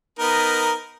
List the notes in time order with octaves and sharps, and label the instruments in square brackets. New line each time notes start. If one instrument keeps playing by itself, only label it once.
[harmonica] B3 D#4 A#4